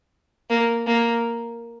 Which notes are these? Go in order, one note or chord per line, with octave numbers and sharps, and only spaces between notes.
A#3
A#3